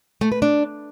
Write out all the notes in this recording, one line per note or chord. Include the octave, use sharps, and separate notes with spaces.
A3
B4
D4